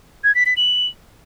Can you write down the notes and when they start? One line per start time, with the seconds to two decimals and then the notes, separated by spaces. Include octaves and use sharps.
0.24 G#6
0.35 B6
0.46 B6
0.57 F#7